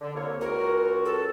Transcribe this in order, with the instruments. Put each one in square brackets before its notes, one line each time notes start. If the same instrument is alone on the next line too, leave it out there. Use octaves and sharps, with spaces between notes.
[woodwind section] D3
C2 A#3 C#5
[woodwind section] C#2 F#4 [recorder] A#4
[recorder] A4